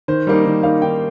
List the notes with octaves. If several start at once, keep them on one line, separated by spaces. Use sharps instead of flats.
D#3 C5
G3 A#3 D#4
D#3
G3 A#3 D#4 F5
D#3 G5